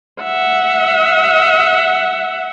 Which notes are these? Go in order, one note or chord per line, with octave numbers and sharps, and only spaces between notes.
E5 F#5